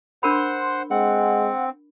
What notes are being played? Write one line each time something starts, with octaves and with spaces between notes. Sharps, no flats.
D4 A#4 C5 F#5 B5 C6
G#3 C4 F#5